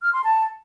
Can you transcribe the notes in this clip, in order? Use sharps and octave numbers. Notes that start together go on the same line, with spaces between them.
F6
C6
A5